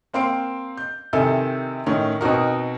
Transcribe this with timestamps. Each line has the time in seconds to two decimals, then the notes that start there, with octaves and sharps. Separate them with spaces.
0.14 A#3 C4 F5 C6 D7
0.77 G6
1.13 C3 D#3 E4 A4 G#5
1.86 A2 D#3 C#4
2.21 B2 C4 D#4 F#4 A#4